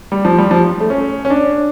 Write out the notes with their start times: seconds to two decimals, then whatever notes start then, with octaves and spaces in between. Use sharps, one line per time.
0.12 G3
0.25 F3
0.38 G3
0.51 F3
0.80 A3
0.90 C#4
1.25 C#4
1.30 D4